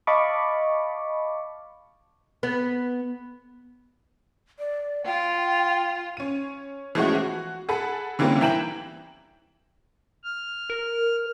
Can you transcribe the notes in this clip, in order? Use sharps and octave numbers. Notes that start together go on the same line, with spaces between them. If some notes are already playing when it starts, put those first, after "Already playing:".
D#5 F5 A5 B5 C#6 D6
B3
D5
F4 G5
C#4 D#7
E3 F3 G#3 A3 C#4 F#4
F#4
G#4 A4 F#5 B5
D3 E3 G3 A#3 C4 C#4
E3 E4 G5 A#5 E7 F#7
F6
A#4